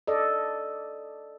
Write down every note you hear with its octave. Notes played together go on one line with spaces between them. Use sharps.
A4 D5 D#5